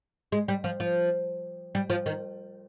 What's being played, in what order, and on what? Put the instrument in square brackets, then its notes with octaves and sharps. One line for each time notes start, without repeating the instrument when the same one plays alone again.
[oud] G#3
G3
F3
F3
G3
F3
D#3